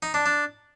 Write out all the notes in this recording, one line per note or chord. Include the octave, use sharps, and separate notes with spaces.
D#4
D4
D4